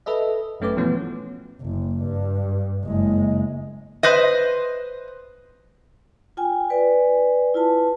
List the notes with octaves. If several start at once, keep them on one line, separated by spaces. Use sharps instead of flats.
A4 B4 D#5 E5
G1 F#2 A3 C#4 B4 D6
B2 E3 F3 A3 B3 C#4
F#1
G2
F#1 G#3
B4 C5 D#5
F4 G5 G#5
B4 D5 G#5
E4 F4 B4 A5